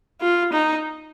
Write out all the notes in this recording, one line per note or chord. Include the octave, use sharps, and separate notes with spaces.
F4
D#4